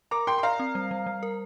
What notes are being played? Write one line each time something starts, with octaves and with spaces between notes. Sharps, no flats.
A#4 A#5 D6
A#4 G5 C6
C6
D5 F5 A#5
C4
G3
G3
G3
A#4